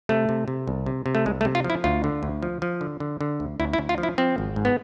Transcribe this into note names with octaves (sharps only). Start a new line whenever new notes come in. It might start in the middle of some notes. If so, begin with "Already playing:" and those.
C3 A3
C3
C3
C2
C3
C3
A3
C2 G#3
A3
C3
F4
F3
E4
D2 F4
D3
D2
F3
F3
D3
D3
D3
D2
D2 E4
E4
D2
F4
F3
E4
F3 C4
G#1
G#2
B3